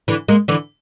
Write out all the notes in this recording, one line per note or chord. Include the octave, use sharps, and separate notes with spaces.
D3 E3
G#3 A#3
D3 E3